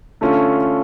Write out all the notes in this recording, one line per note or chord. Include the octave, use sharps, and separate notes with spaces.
D3 A3 C#4 F4